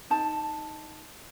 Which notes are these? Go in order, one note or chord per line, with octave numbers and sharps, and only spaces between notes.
D#4 A5